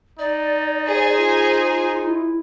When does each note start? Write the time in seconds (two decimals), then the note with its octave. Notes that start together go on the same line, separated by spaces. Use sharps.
0.19 D#4 D5
0.86 G#4 C5 G#5
1.17 F4
2.07 E4